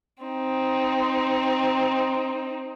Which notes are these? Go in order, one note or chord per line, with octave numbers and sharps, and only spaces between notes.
C4 D#4